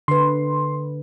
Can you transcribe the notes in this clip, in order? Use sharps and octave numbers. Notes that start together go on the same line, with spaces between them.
D3 B4 C6